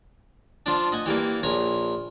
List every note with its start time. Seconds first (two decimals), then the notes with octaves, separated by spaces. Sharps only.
0.66 F3 D4
0.92 D#5 F#5 G#5
1.06 E3 G3 A#3
1.43 A#1 C#5 A#5